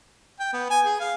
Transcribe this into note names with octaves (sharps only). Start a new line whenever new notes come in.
G5
B3
G#5
G#4
F5